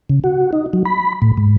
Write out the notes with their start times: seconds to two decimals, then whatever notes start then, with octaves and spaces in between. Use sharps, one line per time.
0.10 C#3
0.24 F#4
0.53 D#4
0.73 F#3
0.86 B5
1.22 A2
1.37 G#2